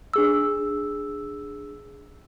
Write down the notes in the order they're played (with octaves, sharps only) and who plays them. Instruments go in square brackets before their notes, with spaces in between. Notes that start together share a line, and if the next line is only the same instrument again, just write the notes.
[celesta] D4 G#4 E6